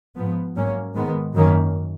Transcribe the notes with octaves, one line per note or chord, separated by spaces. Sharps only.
G#2 F3 B3
G#2 F#3 A#3 C#4
G#2 D#3 G#3 B3
F#2 D#3 A#3 C#4